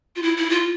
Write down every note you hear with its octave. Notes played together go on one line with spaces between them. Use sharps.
F4
E4
E4
F4